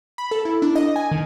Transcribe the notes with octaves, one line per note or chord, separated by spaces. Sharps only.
B5
A4
E4
D4
D#5
G#5
D#3